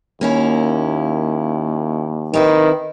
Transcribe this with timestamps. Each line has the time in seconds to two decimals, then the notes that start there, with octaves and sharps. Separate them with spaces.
0.21 D#2 A#3 C#4 E4
2.34 D#3 C4 E4 B4